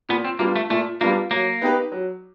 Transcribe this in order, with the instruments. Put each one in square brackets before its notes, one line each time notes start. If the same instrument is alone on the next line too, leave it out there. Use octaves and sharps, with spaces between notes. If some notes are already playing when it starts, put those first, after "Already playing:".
[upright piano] A#2 [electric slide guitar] B3
[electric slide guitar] C4
[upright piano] G3 B3 D4 F4 [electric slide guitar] A#3
[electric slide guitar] A3
[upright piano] A#2 [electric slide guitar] A3
[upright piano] G3 B3 D4 F4 [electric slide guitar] A#3
[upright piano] F#3 [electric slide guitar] A#3
[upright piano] B3 D#4 G4 B4
F#3